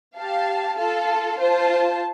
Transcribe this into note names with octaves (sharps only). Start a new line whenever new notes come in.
G4 F5 A5
F4 A4 F5 A5
F4 C5 A5